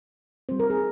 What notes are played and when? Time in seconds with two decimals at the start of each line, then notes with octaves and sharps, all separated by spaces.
0.49 G3 C4 C5
0.59 A#4
0.70 G#4